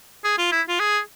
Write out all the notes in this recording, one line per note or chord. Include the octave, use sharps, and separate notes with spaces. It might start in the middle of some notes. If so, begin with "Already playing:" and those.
G#4
F4
E4
F4
G#4